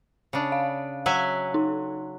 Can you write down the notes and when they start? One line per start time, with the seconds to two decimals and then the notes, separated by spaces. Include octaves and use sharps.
0.33 C#3 D4
0.52 F5
1.06 F#3 E5 G#5
1.54 D#4